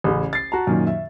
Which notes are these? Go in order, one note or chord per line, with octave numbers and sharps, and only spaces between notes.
A1 C#3
A6 C7
F#4 A5 A#5
F#2 A#2 D#3
E5